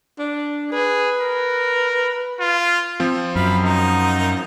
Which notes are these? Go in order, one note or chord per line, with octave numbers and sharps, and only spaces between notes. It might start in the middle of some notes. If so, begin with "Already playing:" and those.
D4
G#4 B4
A#4
F4
F3 C4
F#2 F5 B5
D#4 A#4 D#5